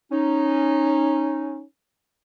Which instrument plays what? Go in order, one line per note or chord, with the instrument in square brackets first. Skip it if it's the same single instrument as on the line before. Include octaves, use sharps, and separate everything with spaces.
[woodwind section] C#4 D#4